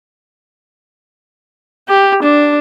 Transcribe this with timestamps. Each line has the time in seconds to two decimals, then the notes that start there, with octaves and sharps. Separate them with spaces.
1.89 G4
2.23 D4